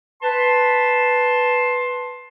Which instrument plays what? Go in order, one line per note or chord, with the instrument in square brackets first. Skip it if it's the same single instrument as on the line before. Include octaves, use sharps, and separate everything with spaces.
[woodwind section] B4 A5 C6